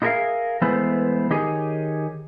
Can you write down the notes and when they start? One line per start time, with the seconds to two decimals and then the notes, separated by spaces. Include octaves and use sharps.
0.02 D#4 E4 G#4 A#4 E5 F5
0.62 E3 G#3 A3 B3 E4 C5
1.30 D#3 D#4 G4 G#4 C#5 G#5